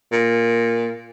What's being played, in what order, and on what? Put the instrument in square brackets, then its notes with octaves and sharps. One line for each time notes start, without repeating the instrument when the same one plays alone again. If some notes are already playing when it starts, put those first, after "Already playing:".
[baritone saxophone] A#2